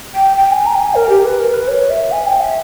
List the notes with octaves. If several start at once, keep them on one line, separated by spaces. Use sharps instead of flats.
G5
G5
G#5
A#5
G5
G#5
A#4
G4
B4
A#4
B4
C#5
E5
G#5
G5
E5